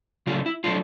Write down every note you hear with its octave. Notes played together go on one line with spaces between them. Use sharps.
C#3 F#3 A3 D4 F4
E4
F#3 A3 D4 F4